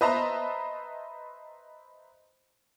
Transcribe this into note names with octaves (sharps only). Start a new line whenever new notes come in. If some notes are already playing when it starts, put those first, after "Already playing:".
B4 C5 D#5 E5 A5 A#5